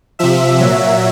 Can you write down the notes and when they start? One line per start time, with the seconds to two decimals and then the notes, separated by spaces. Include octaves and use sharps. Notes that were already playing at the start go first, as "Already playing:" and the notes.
0.19 C3 F3 E5
0.60 A#2 F#3